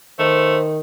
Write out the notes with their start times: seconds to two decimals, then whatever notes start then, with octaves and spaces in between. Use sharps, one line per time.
0.19 D#3 A3 C5